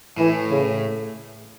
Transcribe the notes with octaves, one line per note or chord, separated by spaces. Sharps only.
A2 E3
C#3